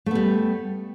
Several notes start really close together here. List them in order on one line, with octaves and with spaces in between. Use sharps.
A3 B3 G3